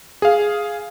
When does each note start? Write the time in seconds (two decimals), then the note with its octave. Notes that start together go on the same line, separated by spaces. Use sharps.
0.22 G#4 F5